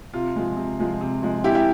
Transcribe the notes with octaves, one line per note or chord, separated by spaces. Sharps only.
C3 F4
F3 G#3
C3
F3 G#3
C3
F3 G#3
C3 E4 G4
E4 G4